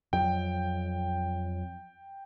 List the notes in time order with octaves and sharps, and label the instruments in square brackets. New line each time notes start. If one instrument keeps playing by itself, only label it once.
[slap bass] F2 F#3 [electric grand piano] G5